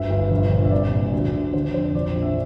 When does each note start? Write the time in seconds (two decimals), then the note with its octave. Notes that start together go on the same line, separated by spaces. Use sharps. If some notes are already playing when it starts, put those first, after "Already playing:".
Already playing: G1 D2 E5
0.10 G1
0.31 A#1
0.52 A#1
0.65 E5
0.71 C2 D5
0.92 A#2
1.13 D2
1.34 D3
1.53 D3 C5
1.74 F2 C5
1.95 A#1 D5
2.15 A#1
2.22 E5